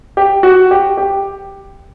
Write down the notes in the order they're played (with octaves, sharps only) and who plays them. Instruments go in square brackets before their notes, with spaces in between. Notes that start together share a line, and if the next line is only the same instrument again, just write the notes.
[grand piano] G4
F#4
G4
G4